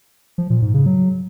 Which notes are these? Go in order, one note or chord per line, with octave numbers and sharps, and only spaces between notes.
F3
A#2
G#2
C#3
F#3